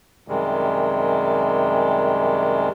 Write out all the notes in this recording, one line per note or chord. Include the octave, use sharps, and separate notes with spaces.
F#2 C3 D#3 G3 G#3